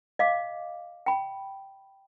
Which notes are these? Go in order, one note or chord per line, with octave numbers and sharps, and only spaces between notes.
D#5 F5 D6
G5 B5